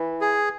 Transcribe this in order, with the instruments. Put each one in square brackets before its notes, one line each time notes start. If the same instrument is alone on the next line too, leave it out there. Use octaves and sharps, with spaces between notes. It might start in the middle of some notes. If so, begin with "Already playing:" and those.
Already playing: [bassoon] E3
[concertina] G#4